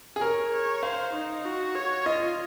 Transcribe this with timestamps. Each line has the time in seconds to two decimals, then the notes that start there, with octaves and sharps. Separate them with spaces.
0.16 G#4
0.21 A#4 C#5
0.52 C#5
0.83 C5 F5
1.14 D#4
1.45 F#4
1.75 C#5
2.06 F4 D#5